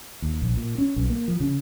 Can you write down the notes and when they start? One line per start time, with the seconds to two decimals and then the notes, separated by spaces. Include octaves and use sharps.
0.22 D#2
0.42 A#1
0.57 A#2
0.78 C#4
0.96 B1
1.10 A#3
1.28 F3
1.40 C#3